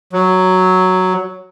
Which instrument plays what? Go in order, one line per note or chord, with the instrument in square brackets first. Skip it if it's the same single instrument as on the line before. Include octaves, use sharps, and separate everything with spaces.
[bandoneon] F#3